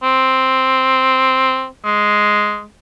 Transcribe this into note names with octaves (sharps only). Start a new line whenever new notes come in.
C4
G#3